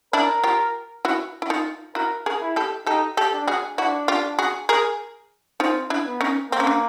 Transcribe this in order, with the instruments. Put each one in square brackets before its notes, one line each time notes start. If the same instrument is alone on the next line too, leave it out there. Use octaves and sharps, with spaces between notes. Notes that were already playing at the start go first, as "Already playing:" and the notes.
[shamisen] D4 E4 [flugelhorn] A#4
[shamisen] F4 G4
E4 F#4
E4
D#4 F4
[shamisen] E4 F#4 [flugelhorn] A#4
[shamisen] G#4 A#4
[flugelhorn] E4
[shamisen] G4 A4
[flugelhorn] D#4 [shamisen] G4 A4
[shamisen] G4 A4
[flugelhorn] D4
[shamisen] F#4 G#4
[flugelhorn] D4 [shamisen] E4 F#4
[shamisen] F4 G4
F#4 G#4
G#4 A#4
[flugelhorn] C4 [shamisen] D#4 F4
[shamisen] D4 E4
[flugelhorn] B3
[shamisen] C#4 D#4
[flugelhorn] A#3 [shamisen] C4
[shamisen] C#4
D4